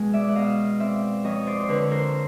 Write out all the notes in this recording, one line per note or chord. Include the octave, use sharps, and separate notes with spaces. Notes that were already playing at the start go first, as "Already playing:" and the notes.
Already playing: B2 G#3
D5 E5
F#5
B2 D#5 F5
C4 D5 E5
F2 C#5 D#5
C5 D5
C5
D3 B4 C#5
A#4 C5